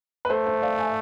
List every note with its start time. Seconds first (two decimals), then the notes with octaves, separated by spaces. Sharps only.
0.25 B4
0.30 A3 A4 C5
0.46 C5 E5
0.62 D5 F5
0.78 E5 G#5